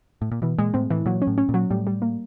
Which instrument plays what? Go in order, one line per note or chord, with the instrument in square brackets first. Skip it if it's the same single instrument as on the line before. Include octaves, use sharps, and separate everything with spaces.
[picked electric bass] A2
A#2
[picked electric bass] B2 [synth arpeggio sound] E3
[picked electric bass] A#2 [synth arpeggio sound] G#3
[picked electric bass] A2 [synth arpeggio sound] C4
[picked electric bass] A2 [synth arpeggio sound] E3
[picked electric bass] A#2 [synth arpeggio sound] F#3
[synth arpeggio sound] C#4
[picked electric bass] A2
[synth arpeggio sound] C#4
[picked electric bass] A#2
[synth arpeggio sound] F#3
[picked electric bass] A2 [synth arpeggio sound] G3
[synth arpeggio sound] G3
A#3